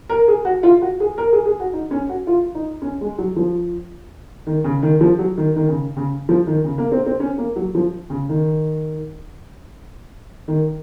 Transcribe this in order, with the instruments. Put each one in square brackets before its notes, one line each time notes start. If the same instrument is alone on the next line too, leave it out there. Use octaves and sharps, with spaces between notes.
[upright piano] A#4
G#4
F#4
F4
F#4
G#4
A#4
G#4
G#4
F#4
D#4
C#4
F#4
F4
D#4
C#4
G#3
F#3
F3
D#3
C#3
D#3
F3
F#3
D#3
D#3
C#3
C#3
F3
D#3
C#3
A#3
C4
C4
C#4
A#3
F#3
F3
C#3
D#3
D#3